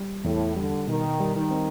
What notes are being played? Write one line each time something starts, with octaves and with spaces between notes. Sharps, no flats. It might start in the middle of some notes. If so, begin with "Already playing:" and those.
Already playing: G3
E2 A2
D3 G3
B2 D#3
G3
D#3
C4